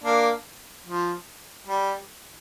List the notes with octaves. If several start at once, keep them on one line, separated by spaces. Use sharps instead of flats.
A#3 D4
F3
G3